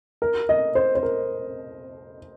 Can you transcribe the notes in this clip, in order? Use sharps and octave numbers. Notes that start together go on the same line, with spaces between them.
A#4
D#5
C5
C5
A#4